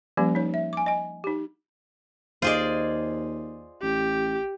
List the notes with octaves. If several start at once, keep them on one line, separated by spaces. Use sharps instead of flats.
F3 G3 A#3 C#4 G4
D#4 C#5
E5
G#5 D6
D#5 G#5
D#4 G4
D#2 F4 G#4 C5 D5 D#5
A1 G4